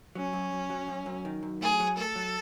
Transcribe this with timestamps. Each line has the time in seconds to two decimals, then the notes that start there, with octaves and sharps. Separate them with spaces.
0.15 F#3 C#4
0.33 F#2
0.52 F#2
0.70 F#3
0.88 F#2
1.06 F#2
1.25 D#3
1.43 F#2
1.61 A2 G#4
1.80 F#3
1.97 A2 A4
2.15 F#3